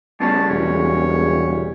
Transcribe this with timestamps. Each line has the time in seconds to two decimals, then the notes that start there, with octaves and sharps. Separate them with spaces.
0.20 G2 C#3 G3 B3 A5
0.50 E1 C#5